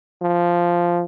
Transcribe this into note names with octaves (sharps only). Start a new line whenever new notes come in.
F3